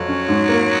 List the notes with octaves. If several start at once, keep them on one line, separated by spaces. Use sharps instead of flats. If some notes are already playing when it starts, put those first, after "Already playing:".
Already playing: F2 F#3
C#4
G#2
A#3